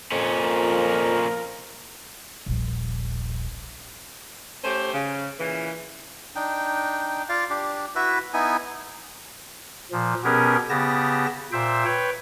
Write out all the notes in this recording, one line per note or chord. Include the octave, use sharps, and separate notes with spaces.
F2 A#2 C#4
F3 F4 A#4
D#1 A#1
A3 C#4 G4 C5
C#3
A#2 C#3 E3
D4 D#4 G5
F4 D5 F5
D4 G4
E4 F#4 B4 E5
B3 D#4 E4 G#5
A#2 F3
B2 B3 C#4 G4 G#4 A#4
C#3 B3 G4 A5 A#6
A#2 C5 E5 G5
B4 C#5 G5